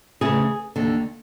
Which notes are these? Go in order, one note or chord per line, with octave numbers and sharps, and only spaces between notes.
D2 C#3 E3 G#4
D#2 D3